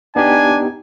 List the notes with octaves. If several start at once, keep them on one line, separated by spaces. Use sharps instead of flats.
B3 D4 D#4 G4 G#5